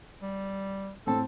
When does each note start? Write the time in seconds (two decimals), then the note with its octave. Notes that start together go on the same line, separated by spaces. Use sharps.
0.22 G3
1.07 A2 C4 A4 A5